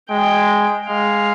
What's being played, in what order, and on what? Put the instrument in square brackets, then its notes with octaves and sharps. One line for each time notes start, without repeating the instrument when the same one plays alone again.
[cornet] G#3 [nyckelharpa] G5
[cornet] G#3 [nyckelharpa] F5